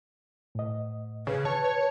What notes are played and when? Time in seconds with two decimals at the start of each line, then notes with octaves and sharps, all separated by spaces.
0.55 A2 D#5
1.27 C#3 B4
1.45 C#5 A5
1.64 C#5